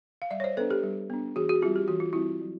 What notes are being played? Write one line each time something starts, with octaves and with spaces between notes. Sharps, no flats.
F5
G3 D5 E5
C#5
C5 D5
B3 D4 A4 B4
G4 A4
G3
B3 D4
E3 F#4 G#4
F#4 G#4
G3 C4 F4 G4
G4
E3 F#4
F4
G3 C4 E4 F#4
F#3